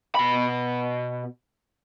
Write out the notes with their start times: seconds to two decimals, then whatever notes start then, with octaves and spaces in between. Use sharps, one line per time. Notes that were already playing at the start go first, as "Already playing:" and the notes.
0.15 B2 B5